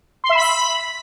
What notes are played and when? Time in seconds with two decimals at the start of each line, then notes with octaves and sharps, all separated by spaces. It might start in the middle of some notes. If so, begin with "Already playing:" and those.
0.24 C6
0.29 E5
0.35 B5